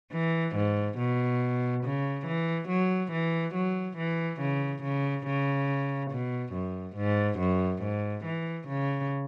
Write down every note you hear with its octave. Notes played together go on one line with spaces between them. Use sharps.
E3
G#2
B2
C#3
E3
F#3
E3
F#3
E3
C#3
C#3
C#3
B2
F#2
G#2
F#2
G#2
E3
C#3